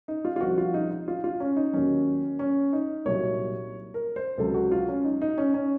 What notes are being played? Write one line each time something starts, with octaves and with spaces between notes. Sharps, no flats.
D#4
F4
F4
C2 C3 F3 F#4
F4
D#4
D#4
F4
F4
C#4
D#4
D#2 D#3 F#3 C#4
C#4
D#4
C2 A#2 F#3 C#5
A#4
C5
C#2 C3 F#3 A4
F#4
F4
C#4
D#4
D#4
C#4
C#4